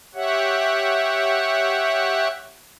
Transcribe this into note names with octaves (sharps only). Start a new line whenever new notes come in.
G4 C#5 E5 F#5